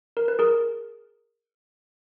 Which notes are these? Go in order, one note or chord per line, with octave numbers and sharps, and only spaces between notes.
A#4
B4
G#4 A#4